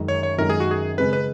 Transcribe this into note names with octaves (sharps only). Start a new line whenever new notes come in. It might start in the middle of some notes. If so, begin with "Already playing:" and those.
Already playing: F#2 D#3 G#3
C#5
C#5
F#2 D#3 G#3 A#4
G#4
F#4
G#4
C#3 G#3 C#4 G#4 B4
B4